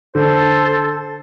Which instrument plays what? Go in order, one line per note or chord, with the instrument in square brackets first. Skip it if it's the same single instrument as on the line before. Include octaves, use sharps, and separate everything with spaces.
[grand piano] D3 [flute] A4 [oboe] C5